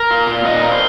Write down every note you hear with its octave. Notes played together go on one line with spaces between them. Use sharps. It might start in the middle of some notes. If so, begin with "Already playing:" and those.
Already playing: A#4
F4
A#2
A#2 D#5
A#3 A#4
C5